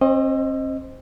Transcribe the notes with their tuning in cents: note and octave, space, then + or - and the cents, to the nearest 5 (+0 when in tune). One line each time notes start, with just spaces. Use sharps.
C4 +40 C5 +0 D#5 +0